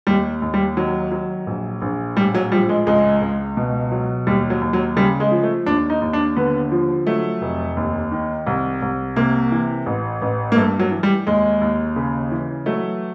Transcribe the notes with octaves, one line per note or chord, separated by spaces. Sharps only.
D#2 G3
D#2
G3
D#3 F#3
F#3
A#1
A#1
A2 G3
F#3
F3 G3
G#3
C#2 G#3
C#2
B2
F#3
D#2 G3
F#3
D#2
F#3
C#3 G3
G#3
F3
A3
D#2 D4
D#4
D#2
D4
D3 B3
F3
F#3 A3
F1
D#2
D#3
C2
C2
C3 A#3
E3
A1
A1
A#3
G2 A3
F#3
E3
G3
D#2 G#3
D#2
C#3
E3
F#3 A3